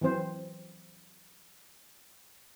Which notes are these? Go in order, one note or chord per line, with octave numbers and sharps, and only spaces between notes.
E3 F#3 C4 C5